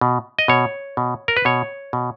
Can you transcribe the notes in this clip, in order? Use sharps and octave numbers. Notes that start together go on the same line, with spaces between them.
B2
D#5
B2 C#5
B2
A#4
B4
B2 C#5
B2